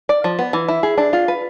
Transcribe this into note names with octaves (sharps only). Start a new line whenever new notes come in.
D5
F3
B3
E3
E4
G#4
D4
F4
B4